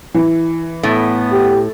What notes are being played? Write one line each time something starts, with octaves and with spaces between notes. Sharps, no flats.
E3
A2 B3
G4